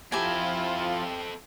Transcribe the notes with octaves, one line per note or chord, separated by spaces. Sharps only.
F3 C4 E4 F4 G4 A4 G#5